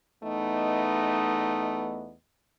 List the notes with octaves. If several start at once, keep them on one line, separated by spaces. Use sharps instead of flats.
E2 A3 B3 D#4 D#5